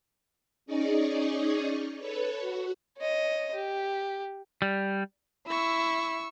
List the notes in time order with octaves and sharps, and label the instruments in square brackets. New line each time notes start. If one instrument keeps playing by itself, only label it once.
[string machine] C#4 D#4 G#4 D5 D#5 C#6
A4 B4 C#5
F#4
[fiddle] C#5 D#5
G4
[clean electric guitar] G3
[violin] E4 [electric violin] C#6 E6